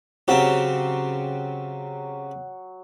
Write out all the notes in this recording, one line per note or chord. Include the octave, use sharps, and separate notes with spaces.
C#3 F#3 C4 G4 F#5